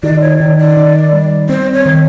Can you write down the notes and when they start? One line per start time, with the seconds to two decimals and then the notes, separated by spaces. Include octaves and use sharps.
0.03 D#3 D5
0.21 C#5
0.40 D#3 D5
0.58 D5
0.77 D#3
1.13 G3
1.49 C4 C5
1.74 C#5
1.86 D#3